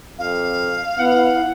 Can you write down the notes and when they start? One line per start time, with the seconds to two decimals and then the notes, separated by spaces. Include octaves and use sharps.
0.19 F2 F5
0.99 B3 E4 F#5